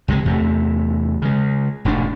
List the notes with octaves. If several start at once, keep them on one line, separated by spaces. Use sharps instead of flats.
C#2 C3 F#3 G#3
E2 C3 A3
C#3 G#3
E1 A1 G#2 D4